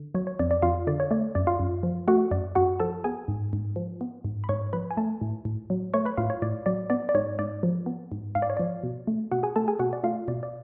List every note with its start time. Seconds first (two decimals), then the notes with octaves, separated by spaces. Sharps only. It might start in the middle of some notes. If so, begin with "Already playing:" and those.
Already playing: D3
0.15 F#3 C#5
0.27 C#5
0.39 F2 D5
0.51 D5
0.62 F2 F4 F5
0.87 D3 D5
1.00 C#5
1.11 A3 D5
1.35 F#2 D5
1.47 F4 F5
1.60 F#2
1.83 F3
2.08 A3 F#4 F#5
2.31 F#2 D5
2.55 F#2 F#4 F#5
2.80 F3 A4 A5
3.04 B3 G#4 G#5
3.28 G#2
3.53 G#2
3.76 F3
4.01 B3
4.25 G#2
4.44 B5
4.49 G#2 C#5 C#6
4.73 F3 B4 B5
4.91 G#5
4.97 A3 A4 A5
5.21 A2
5.45 A2
5.70 F#3
5.94 A3 C#5 C#6
6.05 B4 B5
6.17 A2 F4 F5
6.30 C#5
6.42 A2 D5
6.66 F#3 D5
6.90 B3 D5
7.09 D5
7.15 G#2 C#5
7.39 G#2 D5
7.63 F3
7.86 B3
8.12 G#2
8.35 G#2 F5
8.42 D5
8.50 C#5
8.57 F3 D5
8.83 B2
9.07 A3
9.31 B2 F#4 F#5
9.43 G#4 G#5
9.56 A3 A4 A5
9.68 G#4 G#5
9.79 B2 F#4 F#5
9.93 D5
10.04 A3 F4 F5
10.28 B2 D5
10.43 D5